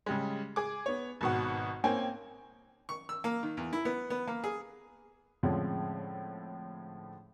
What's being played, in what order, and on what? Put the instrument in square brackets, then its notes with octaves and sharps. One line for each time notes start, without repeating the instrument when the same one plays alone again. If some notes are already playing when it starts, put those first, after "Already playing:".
[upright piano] C#3 G3 G#3
G#4 D6
B3 C#5
G#1 B2 F#5
A#3 C4 C#4 G5 G#5
[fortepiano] C#6
E6
A#3
D#3
E2
E4
B3
B3
A#3
G#4
[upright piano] A2 D3 F3 G#3 C4 C#4